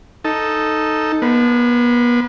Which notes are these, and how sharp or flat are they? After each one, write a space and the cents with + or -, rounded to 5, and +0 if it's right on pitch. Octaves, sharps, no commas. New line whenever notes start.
D#4 +0 A4 +0
B3 -40 B4 +45